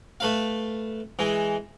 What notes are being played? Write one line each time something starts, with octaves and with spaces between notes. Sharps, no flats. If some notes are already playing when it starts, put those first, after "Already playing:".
A3 B4 F5
E3 G#3